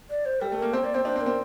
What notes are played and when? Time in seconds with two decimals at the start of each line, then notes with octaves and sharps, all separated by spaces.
0.10 D5
0.25 C5
0.41 G3 A4
0.52 A3 A4
0.57 A#3 A#4
0.73 C4 C5
0.84 A#3 D5
0.94 C4 C5
1.05 D4 C5
1.16 C4
1.21 A#4
1.26 C4